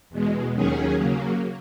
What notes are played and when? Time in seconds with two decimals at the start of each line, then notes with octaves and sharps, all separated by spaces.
0.10 E2 B2 G#3
0.53 D#2 D#3 F#3 C#4 G#4
0.97 C#3 F#3 A#3